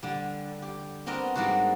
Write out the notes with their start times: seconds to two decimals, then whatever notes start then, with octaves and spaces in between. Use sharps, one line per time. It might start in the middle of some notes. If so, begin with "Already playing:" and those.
0.03 D3 G3
0.62 G4
1.06 B3 C4 D4 A#4 D#5
1.35 G#2 G3 A#3 D4 F#4